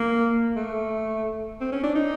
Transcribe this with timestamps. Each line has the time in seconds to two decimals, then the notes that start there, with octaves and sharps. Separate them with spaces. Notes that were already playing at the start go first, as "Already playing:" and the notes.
Already playing: A#3
0.56 A3
1.61 C4
1.72 C#4
1.83 D4
1.95 D#4